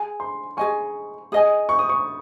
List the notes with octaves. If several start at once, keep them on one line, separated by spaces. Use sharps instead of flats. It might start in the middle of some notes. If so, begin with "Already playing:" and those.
Already playing: G#4 G#5
C6
G#4 D#5 G#5 C#6
G#4 D#5 G#5 D#6
C#6
D#6
C#6